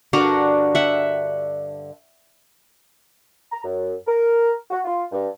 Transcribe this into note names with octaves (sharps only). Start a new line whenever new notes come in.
G2 D3 D4 F#4 A#4
E5 F#5
A#5
F#2
A#4
F#4
F4
G2